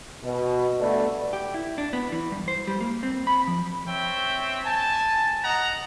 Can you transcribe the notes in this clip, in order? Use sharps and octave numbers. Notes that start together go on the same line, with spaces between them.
B2
G2 A3 B3 D5
G4
E4
D4
B3
E3
G2
C5
G3
A#3
C4
B5
F3
C4 C#5 E5 G5
G#5 A5
D#5 F#5 A#5